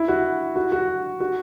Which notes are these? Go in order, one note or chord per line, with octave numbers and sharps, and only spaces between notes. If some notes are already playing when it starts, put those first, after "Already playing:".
Already playing: E4
F#4
F#4
F#4
F#4